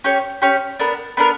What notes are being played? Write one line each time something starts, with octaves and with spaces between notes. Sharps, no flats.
C#4 G4 C#5
C#4 G4 C#5
B3 D4 A#4
B3 D4 A#4